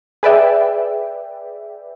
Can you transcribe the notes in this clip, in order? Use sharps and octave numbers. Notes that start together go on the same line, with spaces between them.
G#4 B4 D5 E5 G5